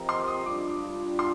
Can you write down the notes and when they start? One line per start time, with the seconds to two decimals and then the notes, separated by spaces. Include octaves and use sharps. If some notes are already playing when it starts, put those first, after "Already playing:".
Already playing: F3 C4 G4 A#4 D#5 A#5
0.09 C6
0.27 D#6
0.46 G3 D4 F4 D6
1.19 C6